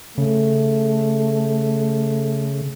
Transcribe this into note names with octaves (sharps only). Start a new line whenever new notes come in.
C#3 A3